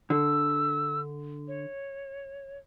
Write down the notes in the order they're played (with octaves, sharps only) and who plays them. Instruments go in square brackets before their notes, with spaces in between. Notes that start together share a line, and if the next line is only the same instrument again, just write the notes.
[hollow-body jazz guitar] D3 [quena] E6
[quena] C#5